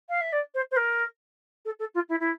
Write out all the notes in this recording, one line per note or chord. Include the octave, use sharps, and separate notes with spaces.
F5
E5
D5
C5
C5
A#4
A4
A4
F4
E4
E4